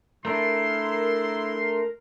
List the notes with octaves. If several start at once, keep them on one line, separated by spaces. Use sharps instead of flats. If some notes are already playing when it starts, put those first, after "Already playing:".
A3 D4 E4 A#4 C6